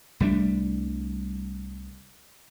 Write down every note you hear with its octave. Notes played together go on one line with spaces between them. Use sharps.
C2 G3 A3 D4